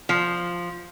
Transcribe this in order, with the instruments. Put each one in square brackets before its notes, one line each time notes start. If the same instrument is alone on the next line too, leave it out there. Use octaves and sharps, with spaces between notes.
[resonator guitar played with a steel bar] F3